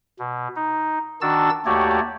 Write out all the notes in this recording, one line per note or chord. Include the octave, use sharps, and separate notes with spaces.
B2
D#4
D#3 D4 F#4 A5 E6 A6
D#2 A3 F#4 G4 C#5 D5